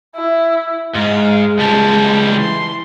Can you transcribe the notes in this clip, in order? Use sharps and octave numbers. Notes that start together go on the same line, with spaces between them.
E4
G#2 G#3 F5
C#2 G3 A5
E3 C6